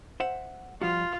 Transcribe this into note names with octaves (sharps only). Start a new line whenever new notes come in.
C5 E5 F#5
F3 G3 F4 F#4